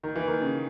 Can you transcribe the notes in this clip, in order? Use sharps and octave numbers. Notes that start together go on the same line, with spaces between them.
D#3
E3
D#3
C#3